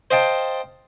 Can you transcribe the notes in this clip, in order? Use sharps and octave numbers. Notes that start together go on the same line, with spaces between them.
C5 D#5 F5 G5 A5